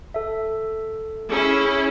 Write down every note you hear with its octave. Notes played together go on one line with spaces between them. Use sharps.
A4 E5
C#4 E4 G#4